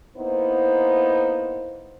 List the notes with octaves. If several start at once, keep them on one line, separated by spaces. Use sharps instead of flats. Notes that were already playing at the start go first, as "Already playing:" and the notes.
A#3 B3 D#4 E4 C5